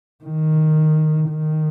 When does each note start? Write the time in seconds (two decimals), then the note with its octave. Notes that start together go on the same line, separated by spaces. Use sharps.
0.25 D#3
1.30 D#3